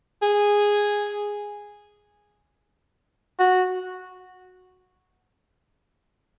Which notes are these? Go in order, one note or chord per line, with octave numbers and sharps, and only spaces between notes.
G#4
F#4